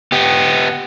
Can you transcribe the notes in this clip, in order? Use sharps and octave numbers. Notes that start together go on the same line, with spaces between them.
B3 G4